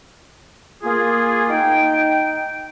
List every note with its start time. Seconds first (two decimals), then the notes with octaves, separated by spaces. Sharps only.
0.83 A#3 F4 G#4
1.50 D#4 G5